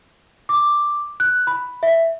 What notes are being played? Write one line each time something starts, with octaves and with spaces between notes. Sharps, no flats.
D6
F#6
B5
E5